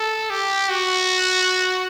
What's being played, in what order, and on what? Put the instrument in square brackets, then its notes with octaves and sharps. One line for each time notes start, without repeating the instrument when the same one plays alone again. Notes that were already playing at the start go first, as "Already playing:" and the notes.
Already playing: [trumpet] A4
G4
F#4